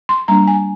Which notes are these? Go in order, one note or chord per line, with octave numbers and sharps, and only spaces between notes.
C6
G3 A#3 D4 A#5
G#5